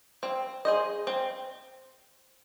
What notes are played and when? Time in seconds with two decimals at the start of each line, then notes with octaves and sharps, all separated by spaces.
0.23 C4
0.65 G#4 C5 D#5
1.07 C4